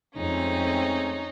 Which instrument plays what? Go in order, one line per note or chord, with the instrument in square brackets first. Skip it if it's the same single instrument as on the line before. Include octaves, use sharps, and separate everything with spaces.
[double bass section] F2 [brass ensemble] G#3 A3 C4 [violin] C#4 D#4